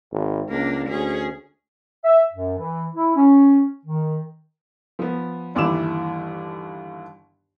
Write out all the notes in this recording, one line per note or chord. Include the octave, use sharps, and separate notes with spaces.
G#1
C#2 A#3 D4
D2 C#4 G#4
E5
F#2
E3
E4
C#4
D#3
F3 B3
G1 D#2 E3 E4 D6 E7